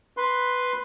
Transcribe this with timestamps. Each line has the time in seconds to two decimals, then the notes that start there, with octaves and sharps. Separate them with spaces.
0.17 B4 C6